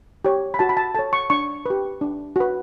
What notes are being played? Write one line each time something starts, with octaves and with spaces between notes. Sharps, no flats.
G4 C#5
B5
F#4 A5
B5
A5
A4 C#5 A5
C#6
D4 C#6
G4 B4
D4
F#4 B4